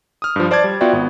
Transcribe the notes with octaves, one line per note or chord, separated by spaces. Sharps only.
D#6 F6
G2 F3
C5 D5 A5 D6 G#6 A6
G3
B3 F4 F#4 D5 E5 G5
G#1 B3